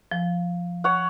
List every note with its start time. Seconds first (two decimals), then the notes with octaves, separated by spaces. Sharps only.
0.11 F3
0.84 C#5 F#5